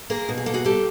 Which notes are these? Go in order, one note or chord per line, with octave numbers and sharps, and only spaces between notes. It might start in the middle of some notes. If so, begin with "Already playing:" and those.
A#3 G#4 A#4
B2
G#4
A#3 A4
F#4 G#4
G3 G4 A4